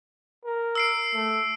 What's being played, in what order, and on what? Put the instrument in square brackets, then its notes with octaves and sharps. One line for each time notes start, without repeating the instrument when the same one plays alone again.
[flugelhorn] A#4
[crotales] E6 C7 D7
[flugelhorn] A3